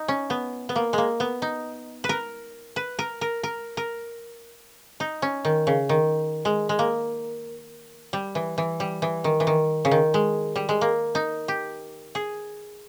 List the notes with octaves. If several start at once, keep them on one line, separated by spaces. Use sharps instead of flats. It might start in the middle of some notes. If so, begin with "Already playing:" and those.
Already playing: D#4
C#4
B3
B3
A#3
G#3 A#3
B3
D#4
B4
A#4
B4
A#4
A#4
A#4
A#4
D#4
C#4
D#3
C#3
D#3
G#3
G#3
A#3
G3
E3
E3
G3
E3
D#3
E3
D#3
C#3
D#3
G#3
G3
G#3
A#3
D#4
G4
G#4